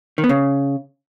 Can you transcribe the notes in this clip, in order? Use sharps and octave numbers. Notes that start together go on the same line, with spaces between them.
D#3
B3
C#3